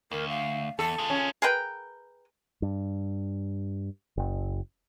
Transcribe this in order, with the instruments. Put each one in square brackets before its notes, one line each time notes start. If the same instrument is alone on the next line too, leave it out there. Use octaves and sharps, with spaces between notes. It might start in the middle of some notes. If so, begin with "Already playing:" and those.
[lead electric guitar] D2 [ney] A#4
[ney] F5
[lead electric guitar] E2 [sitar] A4 [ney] A5
[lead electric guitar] F4 G#4
[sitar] C#4
[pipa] G#4 A#4 B4 G5
[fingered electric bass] G2
F#1